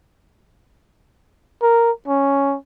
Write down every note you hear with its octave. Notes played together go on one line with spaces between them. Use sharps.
A#4
C#4